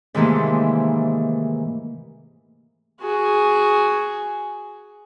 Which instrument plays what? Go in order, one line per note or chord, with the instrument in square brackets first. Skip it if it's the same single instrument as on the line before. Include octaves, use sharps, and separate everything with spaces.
[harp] G#2 C3 D#3 E3 A3 A#3
[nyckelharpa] F#4 G#4